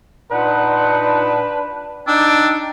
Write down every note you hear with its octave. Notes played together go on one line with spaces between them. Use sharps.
A#2 D4 D#4 B4 F#5
D4 D#4 G5 E6